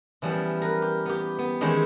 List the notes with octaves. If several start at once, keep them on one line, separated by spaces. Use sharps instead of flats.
E3 F3 G3 B3 C#4
A#4 B4
G4
B3 G4
B3
D#3 E3 G#3 C#4 E4 C5